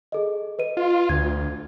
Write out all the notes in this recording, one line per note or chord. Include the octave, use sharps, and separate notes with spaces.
G#4 A4 D#5
B4 D#5 D#7
F4
D2 G#6